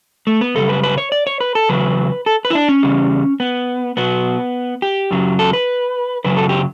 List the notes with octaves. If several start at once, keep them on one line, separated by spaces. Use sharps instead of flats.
A3
B3
F#2 C#3 G3 A4
B4
B4
C#5
D5
C#5
B4
A4
E2 C#3 F#3 B4
A4
B4
E4
D4
C#4
E2 C#3 G3
B3
B2 F#3 B3
G4
F#2 C#3 F#3
A4
B4
F#2 C#3 F#3 B4
A4
G4